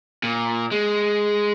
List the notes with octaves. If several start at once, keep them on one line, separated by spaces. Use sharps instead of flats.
A#2
G#3